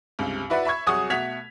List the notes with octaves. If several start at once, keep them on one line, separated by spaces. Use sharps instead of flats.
C#2 G2 C3
E4 F#4 B4 D5 E5 F#5
E5 B5 C#6 G#6
C2 F#3 G#4 F#5 C#6 D#6
B2 A3 F#5 G#6 B6 F7